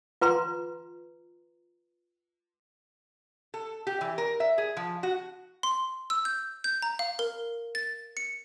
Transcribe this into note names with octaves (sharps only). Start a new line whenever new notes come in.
F4 B4 A#5 C6
A4
G4
E3
A#4
E5
G#4
F3
F#4
C6
E6
G6
G6
A#5
F5
A#4
A6
C#7